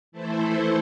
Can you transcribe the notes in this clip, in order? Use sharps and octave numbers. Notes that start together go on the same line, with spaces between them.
E3 A3 E4 A4 C5